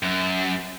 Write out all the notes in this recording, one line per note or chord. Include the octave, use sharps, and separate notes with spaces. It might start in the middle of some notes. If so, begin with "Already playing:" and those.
F#2